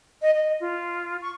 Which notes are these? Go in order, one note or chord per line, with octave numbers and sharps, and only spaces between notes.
D#5
D#5
F4
C#6